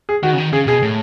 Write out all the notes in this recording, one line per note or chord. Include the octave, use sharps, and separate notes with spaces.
G#4
D#3 F#4
C#3
D#3
C#3 G#4
B2 G#4
A2